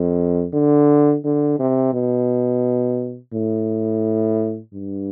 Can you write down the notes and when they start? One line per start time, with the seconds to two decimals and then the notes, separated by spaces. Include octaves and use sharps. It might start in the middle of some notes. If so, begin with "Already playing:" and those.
Already playing: F2
0.53 D3
1.24 D3
1.59 C3
1.93 B2
3.34 A2
4.74 G2